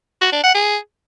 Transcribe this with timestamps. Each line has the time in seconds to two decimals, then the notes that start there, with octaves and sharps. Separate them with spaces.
0.21 F#4
0.32 D4
0.43 F#5
0.54 G#4